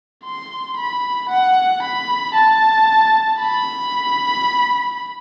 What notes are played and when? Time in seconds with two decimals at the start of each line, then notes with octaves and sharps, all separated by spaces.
0.24 C6
0.77 B5
1.29 F#5
1.82 B5
2.34 A5
3.40 B5